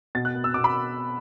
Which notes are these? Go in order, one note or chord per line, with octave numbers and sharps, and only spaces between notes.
B2 A6
F#6
B3
E6
B2 D6
B5